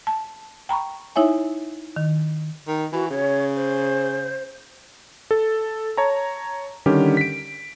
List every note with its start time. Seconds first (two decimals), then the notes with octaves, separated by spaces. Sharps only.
0.07 A5
0.69 G5 A#5 B5 C#6
1.16 D#4 E4 C#5 E5 G#5
1.96 D#3
2.67 D#3
2.93 E3 F#4
3.10 C#3 C#5
3.56 C5
5.31 A4
5.97 C#5 A5 A#5
6.86 D3 D#3 G3 C#4 G4
7.17 B6 D7